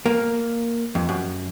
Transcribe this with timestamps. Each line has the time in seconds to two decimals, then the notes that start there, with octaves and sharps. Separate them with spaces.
0.06 A#3
0.95 F2
1.09 F#2